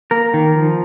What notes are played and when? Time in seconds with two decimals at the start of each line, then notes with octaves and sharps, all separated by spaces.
0.11 A#3 A#4
0.34 D#3
0.55 F3